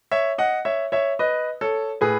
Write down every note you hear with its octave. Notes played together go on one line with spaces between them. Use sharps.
C#5 E5
D#5 F#5
C#5 E5
C#5 E5
B4 D#5
A4 C#5
A2 G#4 B4